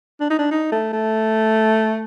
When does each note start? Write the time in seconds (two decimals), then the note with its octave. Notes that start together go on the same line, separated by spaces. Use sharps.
0.21 D4
0.30 D#4
0.39 D4
0.51 D#4
0.72 A3
0.93 A3